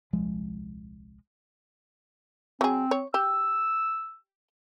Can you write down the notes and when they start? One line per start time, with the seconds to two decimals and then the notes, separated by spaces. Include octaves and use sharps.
0.13 D#1 C2 F3 G#3
2.61 F#3 C4 G#4
2.91 C#5
3.14 G4 E6